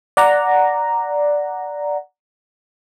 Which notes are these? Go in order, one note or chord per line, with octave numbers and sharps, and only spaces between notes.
D5 F#5 A#5